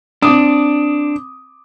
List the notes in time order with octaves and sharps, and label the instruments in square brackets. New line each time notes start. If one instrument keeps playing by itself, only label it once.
[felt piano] C4 D6 D#6 [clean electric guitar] D4